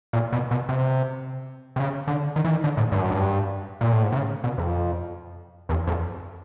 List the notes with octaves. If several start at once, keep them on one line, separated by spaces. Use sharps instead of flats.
A#2
B2
B2
C3
C3
C#3
D3
D#3
E3
D#3
D3
A2
G2
F#2
G2
A#2
A2
G#2
C3
C#3
B2
F2
E2
F2